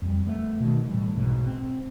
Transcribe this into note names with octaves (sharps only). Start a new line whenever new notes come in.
F2 G3
A3 B3
B2 D#3
A2 E3 G3
B1 G#2 B2
C4